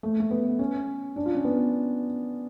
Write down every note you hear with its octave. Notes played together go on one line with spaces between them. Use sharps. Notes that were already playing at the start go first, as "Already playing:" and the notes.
A3
A3
B3
C#4
D4
F4
C#4
B3